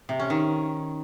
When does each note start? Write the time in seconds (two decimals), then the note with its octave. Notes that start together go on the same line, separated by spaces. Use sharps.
0.09 C3
0.19 C#4
0.30 D#3